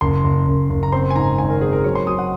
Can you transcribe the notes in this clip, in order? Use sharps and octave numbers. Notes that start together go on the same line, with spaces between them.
F#1 C6
F#1
F#1
F#1
A#5
C4 C6
G#5
G#2 A#5
G#1 G#5
A#4
C4 G#4
A#4
F#3 C#5
C6
F#3 D#6
F#5